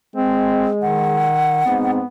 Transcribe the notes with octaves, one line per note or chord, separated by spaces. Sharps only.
G#3 C4
D#3 F#5
G#2 B3 C4